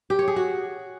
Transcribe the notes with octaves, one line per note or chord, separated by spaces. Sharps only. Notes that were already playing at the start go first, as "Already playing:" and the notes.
G4
C#5
G#4
F#4